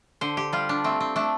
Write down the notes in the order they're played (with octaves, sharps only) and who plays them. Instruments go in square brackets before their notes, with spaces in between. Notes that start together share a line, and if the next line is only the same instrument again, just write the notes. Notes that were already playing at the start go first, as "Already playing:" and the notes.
[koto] D3 C5
G4
G3 F4
D4
A3 C4
C4
A3 D4